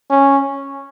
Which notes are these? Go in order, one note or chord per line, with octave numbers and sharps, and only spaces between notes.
C#4